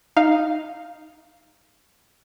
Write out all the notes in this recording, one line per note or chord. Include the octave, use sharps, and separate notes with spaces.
D#4 F5